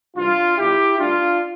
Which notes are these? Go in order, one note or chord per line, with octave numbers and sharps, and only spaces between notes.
C2 C3 E3 G3 D4 F4
B1 B2 G3 E4 G4
D2 D3 G3 D4 F4